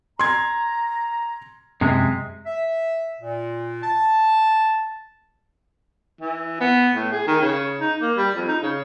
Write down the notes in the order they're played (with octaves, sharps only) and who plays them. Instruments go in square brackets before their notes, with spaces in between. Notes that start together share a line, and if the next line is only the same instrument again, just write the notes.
[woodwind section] A#5 [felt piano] C6 G#6
[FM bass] F#2 [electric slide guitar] C3 G#3
[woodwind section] E5
A#2
A5
[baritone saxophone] E3
B3
A2
G#4
D#3
C#3
D#4
A#3
G3
F2
D#4
C#3